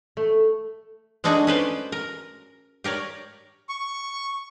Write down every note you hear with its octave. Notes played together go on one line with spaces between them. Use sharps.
A3
G#3 A3 D4 D#4 F#4 G#4
C#4 B4 C5 D5
A#4
G4 A#4 C#5 D5
C#6